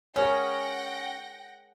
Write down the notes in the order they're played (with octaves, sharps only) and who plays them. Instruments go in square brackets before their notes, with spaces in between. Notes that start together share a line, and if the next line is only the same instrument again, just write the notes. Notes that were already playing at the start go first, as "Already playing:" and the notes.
[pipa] C#4 [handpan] G#4 A#4 C#5 [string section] F#5 G5 A#6